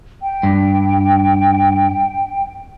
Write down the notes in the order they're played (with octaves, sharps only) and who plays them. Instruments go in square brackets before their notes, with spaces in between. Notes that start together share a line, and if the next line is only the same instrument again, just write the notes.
[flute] G5
[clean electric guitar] G2